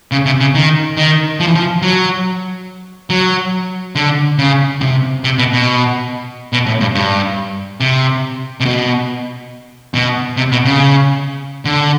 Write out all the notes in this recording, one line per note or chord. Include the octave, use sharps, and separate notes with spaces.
C#3
C3
C#3
D#3
D#3
F3
E3
F3
F#3
F#3
D3
C#3
C3
C3
B2
B2
B2
A2
G2
G2
C3
C3
B2
B2
C3
B2
C#3
D3